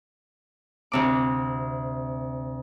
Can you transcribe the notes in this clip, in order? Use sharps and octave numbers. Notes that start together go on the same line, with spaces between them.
D2 C3 D6